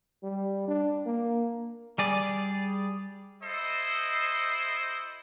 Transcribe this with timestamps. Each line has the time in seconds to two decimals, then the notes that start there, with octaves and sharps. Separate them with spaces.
0.23 G3
0.67 D4
1.06 A#3
1.98 G3 G#4 D5
3.43 E4 A4 C5 D#5